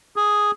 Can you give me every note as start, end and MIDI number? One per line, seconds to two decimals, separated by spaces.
0.16 0.51 68